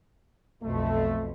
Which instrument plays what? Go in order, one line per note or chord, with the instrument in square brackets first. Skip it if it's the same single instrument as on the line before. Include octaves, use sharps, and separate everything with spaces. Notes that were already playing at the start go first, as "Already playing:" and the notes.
[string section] B1 F2 B2 [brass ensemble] A3